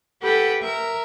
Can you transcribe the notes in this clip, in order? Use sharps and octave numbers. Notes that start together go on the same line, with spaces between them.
G4 A4 B4 F#5 G5
A#4 E5